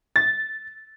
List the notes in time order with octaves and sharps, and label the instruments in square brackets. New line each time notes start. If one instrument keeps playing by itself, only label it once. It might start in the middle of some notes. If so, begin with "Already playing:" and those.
[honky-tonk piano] A6